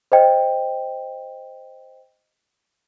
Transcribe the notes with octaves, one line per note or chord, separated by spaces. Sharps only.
C5 D#5 G5